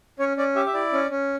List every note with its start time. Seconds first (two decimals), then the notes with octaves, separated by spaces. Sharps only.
0.19 C#4 C#5
0.37 C#4 D5
0.55 G4 E5
0.66 E5
0.74 E4 D5
0.93 C#4
1.10 C#4